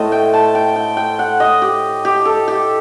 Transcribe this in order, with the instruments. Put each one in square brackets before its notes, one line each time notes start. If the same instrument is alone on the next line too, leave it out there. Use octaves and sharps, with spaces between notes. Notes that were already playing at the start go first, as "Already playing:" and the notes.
Already playing: [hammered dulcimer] A2 A3 C5 D#5
G5
A5
G5
G5
G5
F#5
D#5
G4
G4
A4
G4